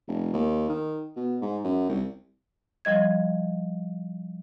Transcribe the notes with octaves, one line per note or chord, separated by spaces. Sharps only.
F1
D#2
D#3
B2
G#2
F#2
C2
F3 G3 D#5 G#6